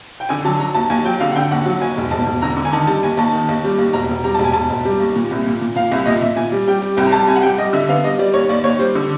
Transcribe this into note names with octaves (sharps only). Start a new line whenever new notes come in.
G5
D3 G#5
F#3 A5
F#3 A#5
D#2 A5
D#2 G#5
F#3 G5
D3 F5
F#5
D3 G5
D#2 F#5
F#3
D#2 G#5
E1
E1 A5
E1
D3 A#5
D3
G#5
D#3 A5
G3 A5
D#2 G#5
D#2 A5
D#3
D#2
G3
D#2
E1 A#5
E1
G3 A#5
E1 A5
G#5
E1 A5
E1
G3
D#2
A#2
C2
A#2
A#2
A#2 F5
C2 E5
A#2 D#5
A#2 E5
A#2 G#5
G3
G3 G5
G3
C2 G5
A#5
G3 A5
C2 G#5
F#5
G3 G5
G3 D#5
D3 E5
B3 F5
G3 D#5
G3 D5
D#2 C#5
D#2 D5
D#2 C#5
G3 C5
D3